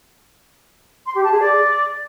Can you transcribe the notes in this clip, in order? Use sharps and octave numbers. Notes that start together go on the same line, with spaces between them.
C6
G4
A5
G#4
D5